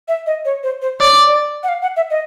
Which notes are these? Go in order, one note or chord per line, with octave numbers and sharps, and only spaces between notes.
E5
D#5
C#5
C5
C5
C#5 D5
D5
F#5
F5
F#5
E5
D#5